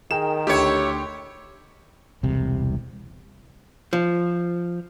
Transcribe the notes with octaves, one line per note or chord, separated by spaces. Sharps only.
D#3 G#4 A#4 G5 E7
D2 E4 G4 C#5 C#7
E1 C2 C3
F3